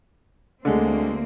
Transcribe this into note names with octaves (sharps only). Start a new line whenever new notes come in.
D2 D3 G#3 A#3 C4